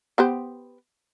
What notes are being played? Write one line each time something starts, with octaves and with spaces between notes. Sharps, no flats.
B3 G4 C5